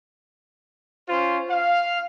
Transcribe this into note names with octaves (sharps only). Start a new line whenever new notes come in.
C#4 F4 C5
F5